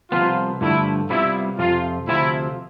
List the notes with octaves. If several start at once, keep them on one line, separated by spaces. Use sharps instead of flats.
C2 C3 F3 B3 F4
G2 D3 F3 A3 E4
C2 C3 G3 B3 E4 F4
F2 C3 F3 F4
D2 C3 F3 C4 E4 F4